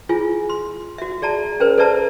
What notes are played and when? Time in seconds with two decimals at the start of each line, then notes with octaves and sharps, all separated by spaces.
0.09 E4 F4 G#4 G#5
0.49 C6
0.98 F#4 E5
1.22 G#4 D5 A5 A#5
1.60 C#4 G#4 A#4 C5
1.78 A4 B4 D5 E5 A5 A#5